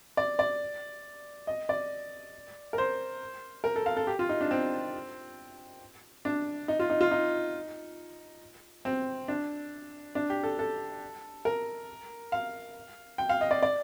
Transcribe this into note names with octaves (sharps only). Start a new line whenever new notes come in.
D5
D5
D#5
D5
A#4
C5
A#4
A4
F5
A4
G4
F4
D#4
D4
C4
D4
D#4
F4
D#4
F4
D#4
C4
D4
D4
G4
A4
A4
A#4
F5
G5
F5
D#5
D5
D5